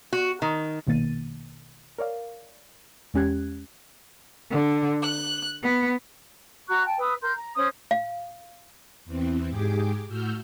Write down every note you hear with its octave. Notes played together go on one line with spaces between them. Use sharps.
F#4
D#3
A#1 B2 D#3 A#3 A6 D#7
A#4 C#5 D5 F5
E2 G#3 C#4 G4 F#6 G#6
D3
F#6
B3
F#4 A#5 C#6 F#6
G5 A5
B4 D#6 E6
A#4 C6 G6
A#5
C#4 C5 D#6
F5
E2 E3 C4
G#2 G4 G#4 D6
A2 F#4 E6 F6 G6